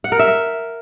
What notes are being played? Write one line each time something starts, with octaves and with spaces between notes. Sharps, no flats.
F#5
A#4
E5